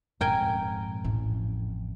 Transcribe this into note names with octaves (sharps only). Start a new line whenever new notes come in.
D#1 F2 G#2 A#4 G5 G#5
A1 F2 A2 C#4